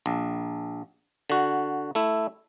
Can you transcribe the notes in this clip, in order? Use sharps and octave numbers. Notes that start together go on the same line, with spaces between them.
A#1
D3 F#4
A3 E4